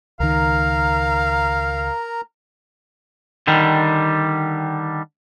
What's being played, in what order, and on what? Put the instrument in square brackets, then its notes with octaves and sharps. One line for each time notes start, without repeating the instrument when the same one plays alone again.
[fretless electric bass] C#2 D#3 [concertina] A#4 A#5 [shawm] F5
[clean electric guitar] D3 D#3 G3